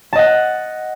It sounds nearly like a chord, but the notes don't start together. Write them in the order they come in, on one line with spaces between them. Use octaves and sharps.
A5 D#5 F#5